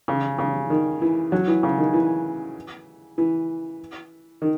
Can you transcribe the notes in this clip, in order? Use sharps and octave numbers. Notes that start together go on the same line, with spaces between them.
C#3
C#3
D#3
E3
F#3
E3
C#3
D#3
E3
E3
D#3